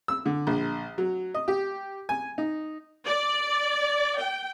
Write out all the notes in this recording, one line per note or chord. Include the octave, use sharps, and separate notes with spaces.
E6
D3
A#1
F#3
D#5
G4
G#5
D#4
D5
G5